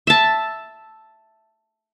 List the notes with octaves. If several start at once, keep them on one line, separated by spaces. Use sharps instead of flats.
E5 A5